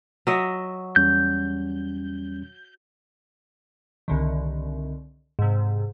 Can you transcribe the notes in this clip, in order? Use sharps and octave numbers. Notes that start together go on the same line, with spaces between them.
F#3 D#5 E5
E2 G3 C#4 G6
C2 D3 D#3
G#2 C3